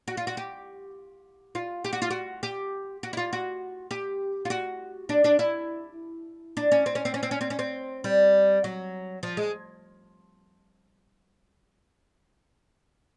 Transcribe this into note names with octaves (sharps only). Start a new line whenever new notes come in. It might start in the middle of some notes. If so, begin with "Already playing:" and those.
F#4
F4
F#4
G4
F4
G4
F#4
F4
F#4
G4
F#4
E4
F4
F#4
G4
F4
F#4
D4
D4
E4
D4
C#4
C4
C#4
C4
C#4
C4
C#4
C4
C#4
C4
G3
F#3
F3
G#3